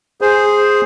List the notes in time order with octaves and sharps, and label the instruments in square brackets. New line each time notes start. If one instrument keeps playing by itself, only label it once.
[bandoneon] G#4 C5